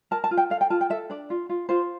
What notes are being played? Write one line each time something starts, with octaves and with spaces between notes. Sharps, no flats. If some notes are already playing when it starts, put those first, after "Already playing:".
A#4 A5
A5
F4
G5
A4 F5
G5
F4 A5
G5
A4 E5
D4 D5
F4
F4
F4 C5